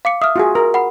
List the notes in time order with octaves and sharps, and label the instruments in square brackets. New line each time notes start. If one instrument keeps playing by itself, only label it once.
[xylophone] F5 D6 C#7
[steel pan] E5 [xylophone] D#6 F6
[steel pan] F4 F#4 G#4
A#4
[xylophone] F#5 B5